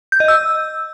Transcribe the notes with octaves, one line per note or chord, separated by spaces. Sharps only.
G6
D#5
E6